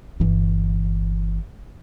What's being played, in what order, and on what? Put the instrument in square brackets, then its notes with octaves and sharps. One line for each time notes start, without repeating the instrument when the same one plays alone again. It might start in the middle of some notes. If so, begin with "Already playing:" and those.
[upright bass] G1 E3